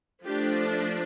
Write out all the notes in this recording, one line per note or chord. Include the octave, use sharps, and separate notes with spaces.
F3 A3 D4 G4